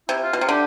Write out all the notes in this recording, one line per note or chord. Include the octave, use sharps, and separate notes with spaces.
C3 E4
F4
B2
F4
C3
D3 G4